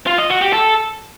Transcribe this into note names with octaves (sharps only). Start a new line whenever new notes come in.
F4
D#5
F#4
G4
A4